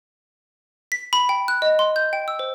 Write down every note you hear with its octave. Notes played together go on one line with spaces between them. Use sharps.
B6
B5
G5
F#6
D#5
C6
G6
G5
E6
C5